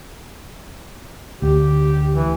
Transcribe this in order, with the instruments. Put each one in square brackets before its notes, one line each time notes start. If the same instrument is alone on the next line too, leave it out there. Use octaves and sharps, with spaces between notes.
[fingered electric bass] D2 [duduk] G4
[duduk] E3